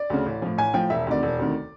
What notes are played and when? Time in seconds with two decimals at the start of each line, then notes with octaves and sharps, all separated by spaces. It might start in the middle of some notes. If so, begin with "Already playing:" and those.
Already playing: D5
0.10 D2 C#3
0.26 A1
0.42 A2 F3
0.58 A1 G#5
0.73 A2 F3 G5
0.90 E1 E5
1.07 D2 C3 D#3 D5
1.23 E1
1.39 D2 C3 D#3